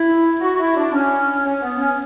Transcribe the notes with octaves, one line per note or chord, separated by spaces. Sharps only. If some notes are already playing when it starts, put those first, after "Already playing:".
Already playing: E4
F#4
F#4
E4
D4
C#4
C#4
B3
C#4